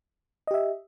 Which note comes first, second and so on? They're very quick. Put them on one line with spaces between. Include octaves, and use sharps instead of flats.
D#5 G4 E5